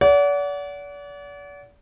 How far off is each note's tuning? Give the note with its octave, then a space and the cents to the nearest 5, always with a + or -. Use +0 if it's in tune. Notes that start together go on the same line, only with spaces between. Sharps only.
D5 -40 F#5 +0